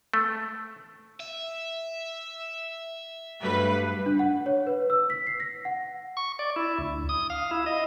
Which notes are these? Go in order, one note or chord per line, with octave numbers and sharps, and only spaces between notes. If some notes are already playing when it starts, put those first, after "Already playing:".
A3
E5
G2 F#3 G3 A3 B4
D4
F#5
C#5
B4
E6
B6
C7
A#6
F#5
C#6
D5
E4
D2
D#6
F5
E4
D#5